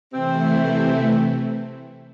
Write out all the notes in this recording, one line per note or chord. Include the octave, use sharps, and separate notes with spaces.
C3 E3 A3 C4 E4